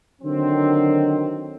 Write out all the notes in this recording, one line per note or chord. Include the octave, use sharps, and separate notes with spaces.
D3 D#3 F#3 C4